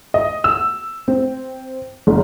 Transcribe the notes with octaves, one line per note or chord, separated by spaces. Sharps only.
D#5
E6
C4
F#1